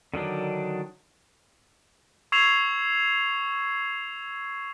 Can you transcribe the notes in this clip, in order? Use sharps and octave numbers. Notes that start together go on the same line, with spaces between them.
D3 D#3 F#3 D4
C#6 E6 G#6 C7 E7 F7